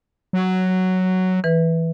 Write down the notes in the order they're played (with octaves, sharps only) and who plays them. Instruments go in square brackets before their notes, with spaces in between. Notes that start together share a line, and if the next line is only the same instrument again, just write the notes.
[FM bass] F#3
[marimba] E3 B4